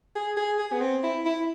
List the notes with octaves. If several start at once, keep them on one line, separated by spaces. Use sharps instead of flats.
G#4
G#4
G#4
B3
C4
E4
E4